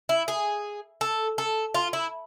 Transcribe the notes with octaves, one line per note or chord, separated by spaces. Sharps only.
E4
G#4
A4
A4
F4
E4